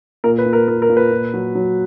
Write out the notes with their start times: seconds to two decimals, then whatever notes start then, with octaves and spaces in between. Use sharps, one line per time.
0.24 A#2 A#4
0.38 B4
0.46 A#2
0.53 A#4
0.68 A#2 A#4
0.82 A#4
0.89 A#2
0.97 B4
1.12 A#2
1.33 F#3
1.55 F#3